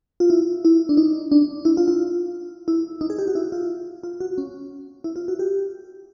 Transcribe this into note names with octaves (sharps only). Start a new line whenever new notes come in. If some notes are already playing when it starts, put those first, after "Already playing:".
F4
E4
E4
D4
D#4
D4
E4
F4
F4
E4
D#4
G#4
G4
F#4
E4
F4
F4
F#4
C#4
E4
F4
F#4
G4